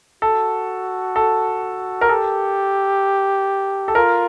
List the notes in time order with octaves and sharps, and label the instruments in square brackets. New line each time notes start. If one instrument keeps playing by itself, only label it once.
[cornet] F#4 [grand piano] A4
[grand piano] A4
A#4
[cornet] G4 [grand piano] A4
[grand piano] A4
[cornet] F4 [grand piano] A#4